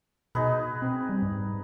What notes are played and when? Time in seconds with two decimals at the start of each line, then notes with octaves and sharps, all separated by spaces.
0.35 B2 D#4 G#4 B4
0.82 C4
1.09 G3
1.23 G#2